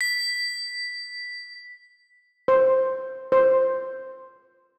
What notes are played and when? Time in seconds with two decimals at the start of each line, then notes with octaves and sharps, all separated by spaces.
0.01 B6
2.48 C5
3.32 C5